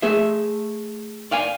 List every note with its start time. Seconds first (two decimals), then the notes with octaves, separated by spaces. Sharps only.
0.02 A3 G#4 E5
1.31 D5 F5 G5 G#5